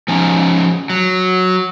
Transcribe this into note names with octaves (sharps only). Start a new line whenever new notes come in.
F3 C#4 D#4
F#3